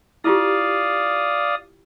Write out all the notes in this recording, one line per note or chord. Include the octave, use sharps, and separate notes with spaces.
E4 F4 G4 D5 F5 D#6